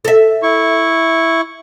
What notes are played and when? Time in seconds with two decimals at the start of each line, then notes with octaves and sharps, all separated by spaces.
0.05 A4 E5
0.43 E4 C#6